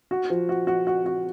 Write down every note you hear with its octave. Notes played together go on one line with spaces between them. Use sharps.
F#4
F3
F#4
F#4
F#4
F#4